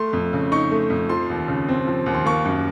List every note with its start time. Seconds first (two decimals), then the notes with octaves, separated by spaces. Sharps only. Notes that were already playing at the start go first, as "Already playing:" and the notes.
Already playing: A3 C6
0.13 F2
0.33 C#3
0.52 D#4 C#6
0.71 A3
0.90 F2
1.09 F3 C6
1.30 D#2
1.48 C#3
1.69 C4
1.87 F3
2.06 D#2
2.14 C6
2.26 A#3 C#6
2.45 F#2